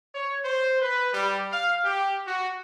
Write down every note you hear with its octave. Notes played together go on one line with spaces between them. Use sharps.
C#5
C5
B4
G3
F5
G4
F#4